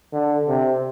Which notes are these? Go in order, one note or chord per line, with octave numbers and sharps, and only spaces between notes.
D3
C3